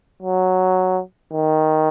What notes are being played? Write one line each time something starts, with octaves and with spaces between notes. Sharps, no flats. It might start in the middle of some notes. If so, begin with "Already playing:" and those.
F#3
D#3